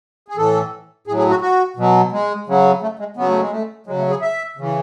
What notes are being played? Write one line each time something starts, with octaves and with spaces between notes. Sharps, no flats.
G#4
A2 E3 A4
A2 F#3 G#4
G#4
F#4
F#4
B2 F#3
G#3
C#3 F#3
A3
G#3
C#3 F#3 B3
A3
G#3
A3
C#3 F#3 G#3
A3
G#4
E5
C#3 E3